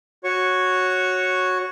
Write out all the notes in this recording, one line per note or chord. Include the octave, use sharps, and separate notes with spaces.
F#4 C#5 C#6